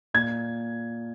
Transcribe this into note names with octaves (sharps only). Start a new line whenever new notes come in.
A#2 G#6